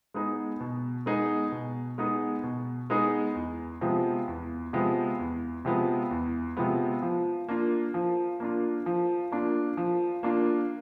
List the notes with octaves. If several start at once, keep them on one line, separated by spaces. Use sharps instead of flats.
G#3 B3 D#4 G#4
B2
G#3 B3 D#4 G#4
B2
G#3 B3 D#4 G#4
B2
G#3 B3 D#4 G#4
E2
C3 F3 G#3 B3
E2
C3 F3 G#3 B3
E2
C3 F3 G#3 B3
E2
C3 F3 G#3 B3
F3
A#3 D4 F4
F3
A#3 D4 F4
F3
A#3 D4 F4
F3
A#3 D4 F4